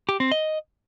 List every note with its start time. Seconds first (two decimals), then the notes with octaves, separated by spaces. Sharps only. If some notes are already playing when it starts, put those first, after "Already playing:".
0.09 G4
0.20 C4
0.32 D#5